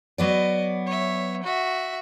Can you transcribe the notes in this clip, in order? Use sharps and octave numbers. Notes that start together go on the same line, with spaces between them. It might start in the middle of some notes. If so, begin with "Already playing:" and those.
F#3 B3 D5 D#5
C#5 E5
F#4 E5